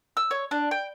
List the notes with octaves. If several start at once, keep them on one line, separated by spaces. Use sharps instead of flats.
E6
C#5
D4
G5